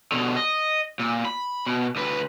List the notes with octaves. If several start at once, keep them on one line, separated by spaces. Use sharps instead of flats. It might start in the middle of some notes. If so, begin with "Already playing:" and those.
B2 D3
D#5
A#2
B5
B2
D2 B4